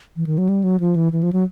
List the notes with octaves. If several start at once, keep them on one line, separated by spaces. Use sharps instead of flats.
E3
D#3
F#3
G3
F#3
F3
E3
E3
F3
F#3